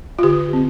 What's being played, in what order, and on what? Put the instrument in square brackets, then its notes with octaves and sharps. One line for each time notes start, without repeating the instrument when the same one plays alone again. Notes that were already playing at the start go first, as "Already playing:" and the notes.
[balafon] F4
D3 G4
C4